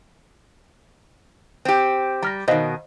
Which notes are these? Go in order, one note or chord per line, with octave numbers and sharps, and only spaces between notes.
C4 G4
G3 A#5 F6 A#6
B2 D#3 C5 D#5 F5